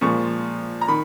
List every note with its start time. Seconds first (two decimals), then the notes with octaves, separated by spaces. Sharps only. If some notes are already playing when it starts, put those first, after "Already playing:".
0.01 A#2 F3 G#3 C#6
0.81 A#5
0.88 D#3 B5